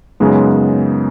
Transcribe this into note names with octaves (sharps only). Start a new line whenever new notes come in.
F#2 C#3 G#3 B3 D#4